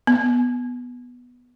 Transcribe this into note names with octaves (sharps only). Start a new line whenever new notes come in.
B3